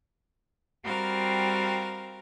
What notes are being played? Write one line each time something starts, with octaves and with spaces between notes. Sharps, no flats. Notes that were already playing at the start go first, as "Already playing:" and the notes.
G3 C4 F#4 A#4 F5